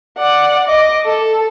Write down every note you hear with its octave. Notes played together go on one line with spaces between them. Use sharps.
D5 F#5
D#5 D6
A4